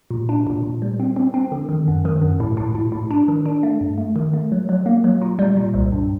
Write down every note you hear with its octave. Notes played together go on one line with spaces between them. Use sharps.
A#2
D4
A#2
A#2
G3
C4
C4
C4
D3
D#3
F#2
D#3
F#2
A2
A2
A2
A2
D4
D#3
D4
A3
G2
A3
D#3
A3
F#3
F#3
A#3
F#3
A#2
G3
A#2
C2
G2